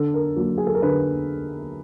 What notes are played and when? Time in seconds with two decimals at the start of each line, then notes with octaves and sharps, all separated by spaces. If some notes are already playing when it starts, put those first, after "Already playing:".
Already playing: D3 A4
0.14 A#4
0.36 F#3 A#3
0.58 G#4
0.67 A4
0.75 A#4
0.82 D3 B4